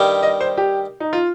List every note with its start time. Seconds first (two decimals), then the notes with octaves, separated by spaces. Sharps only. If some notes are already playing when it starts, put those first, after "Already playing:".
Already playing: G2 D#3 G3
0.23 D#5
0.41 C5
0.57 G4
1.00 D#4
1.13 F4